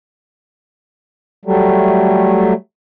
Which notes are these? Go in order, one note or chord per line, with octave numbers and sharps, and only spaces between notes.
F#3 G3 A3